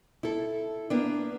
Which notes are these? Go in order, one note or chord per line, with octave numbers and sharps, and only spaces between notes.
E4 A4
A#3 B3 D4